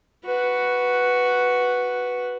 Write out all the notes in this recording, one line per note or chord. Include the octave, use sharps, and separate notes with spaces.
F#4 B4